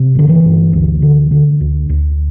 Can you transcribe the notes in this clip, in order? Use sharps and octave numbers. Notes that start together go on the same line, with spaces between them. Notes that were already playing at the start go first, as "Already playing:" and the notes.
Already playing: C3
G1 D3
E3
G1
D2
D3
D3
D2
D2